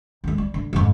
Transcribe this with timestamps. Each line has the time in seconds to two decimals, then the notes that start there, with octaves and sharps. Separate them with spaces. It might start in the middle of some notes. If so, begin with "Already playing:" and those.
0.24 D#2 G#3
0.38 G3
0.54 D3
0.73 F2 G#2